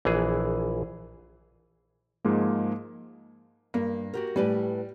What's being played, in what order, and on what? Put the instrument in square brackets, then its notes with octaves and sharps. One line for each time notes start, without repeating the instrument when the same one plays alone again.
[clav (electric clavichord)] A#1 E3 G#4
[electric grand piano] G#2 F3 G#3 A#3
[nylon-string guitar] G2 [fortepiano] A#3
[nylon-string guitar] F#4 G4 A#4
[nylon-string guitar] A2 B4 G#5 [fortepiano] G3